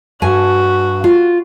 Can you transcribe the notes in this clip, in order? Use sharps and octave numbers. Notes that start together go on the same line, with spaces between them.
G2 F#4 G#5
F4